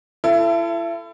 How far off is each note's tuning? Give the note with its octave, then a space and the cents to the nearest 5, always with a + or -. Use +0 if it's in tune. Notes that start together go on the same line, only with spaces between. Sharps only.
E4 +35 A4 +10